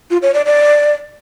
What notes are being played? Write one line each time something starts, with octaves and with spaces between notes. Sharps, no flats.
F4
C#5
D5
D5